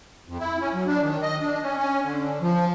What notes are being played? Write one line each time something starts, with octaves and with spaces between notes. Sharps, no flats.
F2
E4
C#4
F#3
D4
D#3
D#5
D4
C#4
C#4
D3
F3